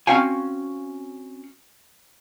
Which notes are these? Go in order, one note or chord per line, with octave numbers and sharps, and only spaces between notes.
C4 C#4 F#4 F5 G5 G#5